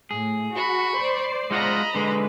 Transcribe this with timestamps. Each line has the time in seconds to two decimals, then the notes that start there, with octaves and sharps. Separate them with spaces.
0.11 A2 G#4
0.54 F#4 B5 C#6
0.96 C5 D5 C7
1.51 G#3 F4 D#5 F#5 A#5 B5
1.95 D3 G#3 B4